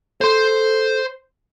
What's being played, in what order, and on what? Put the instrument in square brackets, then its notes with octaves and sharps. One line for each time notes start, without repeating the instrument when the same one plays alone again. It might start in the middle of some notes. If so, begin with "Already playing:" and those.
[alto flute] A4 [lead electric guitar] C5 C6